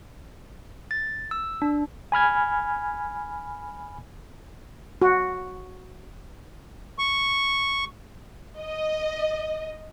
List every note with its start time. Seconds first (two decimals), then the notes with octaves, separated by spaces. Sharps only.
0.91 A6
1.31 E6
1.62 D4
2.12 G#5 B5 F6 G#6
5.02 F#4
6.99 C#6
8.58 D#5